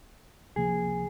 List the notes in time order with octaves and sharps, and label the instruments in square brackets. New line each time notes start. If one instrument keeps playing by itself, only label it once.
[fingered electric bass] C#2 C3 F3 A#3 [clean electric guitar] G#4